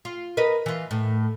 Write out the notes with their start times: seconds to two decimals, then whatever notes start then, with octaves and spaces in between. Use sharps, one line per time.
0.05 F4
0.37 A#4 B4 D#5
0.66 E3 F4
0.91 A2